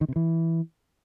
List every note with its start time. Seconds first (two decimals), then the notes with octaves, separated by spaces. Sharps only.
0.01 D#3
0.08 C3
0.16 E3